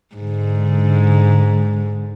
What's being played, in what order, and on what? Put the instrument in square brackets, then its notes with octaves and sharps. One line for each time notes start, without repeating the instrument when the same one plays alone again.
[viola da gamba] G#2 [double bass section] D3 G#3